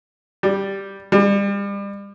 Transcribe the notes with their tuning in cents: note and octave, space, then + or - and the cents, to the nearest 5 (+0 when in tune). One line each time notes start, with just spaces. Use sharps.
G3 +0
G3 +35